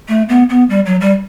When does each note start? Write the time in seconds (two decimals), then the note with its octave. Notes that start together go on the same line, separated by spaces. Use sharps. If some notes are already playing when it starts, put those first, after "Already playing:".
0.08 A3
0.29 B3
0.49 B3
0.70 G3
0.86 F#3
1.01 G3